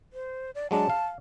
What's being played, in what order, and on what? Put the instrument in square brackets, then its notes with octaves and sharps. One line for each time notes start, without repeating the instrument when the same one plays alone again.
[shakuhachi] C5
D5
[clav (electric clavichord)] F#3 G#3 D4 [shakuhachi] A5
[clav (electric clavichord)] F5